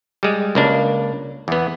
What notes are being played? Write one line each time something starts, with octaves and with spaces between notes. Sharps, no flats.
G3 G#3
C#2 A#3 D4
E2 B3